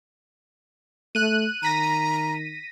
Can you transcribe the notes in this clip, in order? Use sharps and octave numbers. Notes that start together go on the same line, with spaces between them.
A3 F#6 D#7
D#3 A#5 A#6 B6 D#7